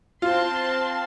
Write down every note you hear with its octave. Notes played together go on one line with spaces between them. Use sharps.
C4 F4 A5 C6